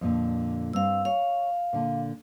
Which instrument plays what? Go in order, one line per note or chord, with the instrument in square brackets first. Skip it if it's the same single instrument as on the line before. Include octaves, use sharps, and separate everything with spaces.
[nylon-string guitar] F2 A#2 D3
[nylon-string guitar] G2 C4 [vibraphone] F5 E6
[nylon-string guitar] C#5 [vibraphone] F5
[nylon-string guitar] A#2 D3